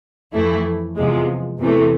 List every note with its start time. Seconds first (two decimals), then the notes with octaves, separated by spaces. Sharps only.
0.34 F2 E3 A3 E4
0.96 E2 C3 F3 G#3
1.59 E2 C3 E3 A3